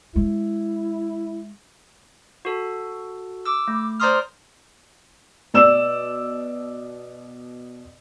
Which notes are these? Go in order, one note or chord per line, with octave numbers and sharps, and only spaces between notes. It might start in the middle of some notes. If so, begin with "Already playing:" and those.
G#3 E4
F#4 A4
D6 E6
A3
C5 D5 A#5 C6 D#6 F6
B2 D5 E6 E7